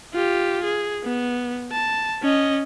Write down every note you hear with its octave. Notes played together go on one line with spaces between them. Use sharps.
F4 G4
G#4
B3
A5
C#4 D#5